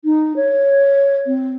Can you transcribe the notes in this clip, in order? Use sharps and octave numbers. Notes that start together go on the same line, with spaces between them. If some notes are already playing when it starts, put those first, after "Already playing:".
D#4
C#5
C4